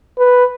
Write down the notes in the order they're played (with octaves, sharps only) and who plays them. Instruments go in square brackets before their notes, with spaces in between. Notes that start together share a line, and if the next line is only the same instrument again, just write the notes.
[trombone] B4